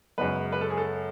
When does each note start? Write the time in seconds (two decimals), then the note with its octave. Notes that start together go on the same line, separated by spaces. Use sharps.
0.18 F#2 C#3 G#3 B3 B4
0.52 B4
0.61 A4
0.70 G#4
0.77 A4